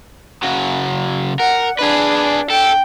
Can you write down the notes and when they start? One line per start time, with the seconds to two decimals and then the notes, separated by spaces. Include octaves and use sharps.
0.43 C#3 F#3
1.40 A#4 F#5
1.79 D4 G#4 B4
2.51 A4 G5